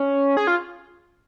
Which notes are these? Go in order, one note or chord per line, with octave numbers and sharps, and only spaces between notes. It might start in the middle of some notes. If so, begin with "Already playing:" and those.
Already playing: C#4
G#4
F4